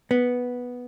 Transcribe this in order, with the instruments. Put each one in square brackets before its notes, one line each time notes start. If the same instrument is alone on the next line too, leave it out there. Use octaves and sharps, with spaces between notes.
[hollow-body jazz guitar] B3